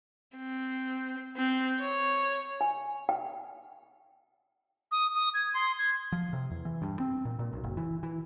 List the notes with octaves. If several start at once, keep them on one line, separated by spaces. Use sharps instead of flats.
C4
C4
C#5
G#5
G5
D#6
D#6
G#6
C6
G#6
F3
C3
E2
E3
G2
C4
A#2
A#2
B1
F#1
E3
E3